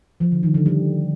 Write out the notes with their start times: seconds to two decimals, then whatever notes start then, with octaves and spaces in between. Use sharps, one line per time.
0.20 F3
0.32 D3
0.43 D#3
0.54 D3
0.66 G3